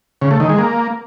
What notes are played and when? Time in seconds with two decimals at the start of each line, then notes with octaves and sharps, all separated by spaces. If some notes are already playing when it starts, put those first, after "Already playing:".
0.22 C#3
0.31 A3
0.40 D#3
0.49 G#3
0.59 A#3